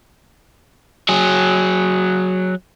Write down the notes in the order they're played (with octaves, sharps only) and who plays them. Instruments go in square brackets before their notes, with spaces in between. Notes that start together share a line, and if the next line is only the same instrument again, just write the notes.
[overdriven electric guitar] F#3 G#4